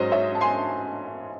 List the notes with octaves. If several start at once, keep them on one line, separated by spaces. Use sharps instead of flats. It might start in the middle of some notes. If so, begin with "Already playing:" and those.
Already playing: G#2 F#3 C#4 C5 D#5
C#5 E5
A5
G#5 C6